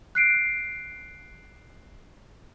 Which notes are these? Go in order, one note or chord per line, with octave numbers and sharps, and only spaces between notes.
F#6 C7 D7